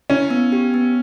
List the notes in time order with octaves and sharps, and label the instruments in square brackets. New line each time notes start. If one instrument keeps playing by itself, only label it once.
[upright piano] C#4 [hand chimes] E4
[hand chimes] B3
G4
B3